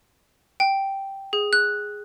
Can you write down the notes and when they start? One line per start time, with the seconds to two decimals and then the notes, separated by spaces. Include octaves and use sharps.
0.60 G5
1.33 G#4
1.53 F#6